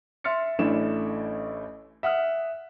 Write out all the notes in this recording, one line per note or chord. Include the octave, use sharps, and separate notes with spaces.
E5 C6 F6 A6 C#7
A1 A3 C#4 D4 E4 E7
E5 F#5 D#6 F6